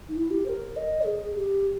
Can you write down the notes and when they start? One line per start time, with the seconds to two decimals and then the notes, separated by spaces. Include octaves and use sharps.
0.08 D#4
0.16 E4
0.30 G4
0.45 C5
0.49 A#4
0.76 D#5
1.05 G#4
1.35 G4